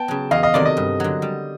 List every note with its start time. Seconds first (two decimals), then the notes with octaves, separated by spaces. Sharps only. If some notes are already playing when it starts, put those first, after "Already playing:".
Already playing: B3 G5 A5
0.08 C#3 F#3
0.31 E2 D#5 F5
0.43 D#5 F5
0.54 C3 D#3 F#3 A3 D5
0.66 D#5
0.77 G2
1.00 D3 F#3
1.22 G3